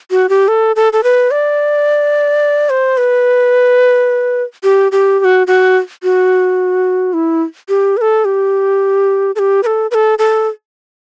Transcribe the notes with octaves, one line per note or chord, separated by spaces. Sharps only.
F#4
G4
A4
A4
A4
B4
D5
C5
B4
G4
G4
G4
F#4
F#4
F#4
E4
G4
B4
A4
G4
A4
G4
B4
A4
B4
A4
A4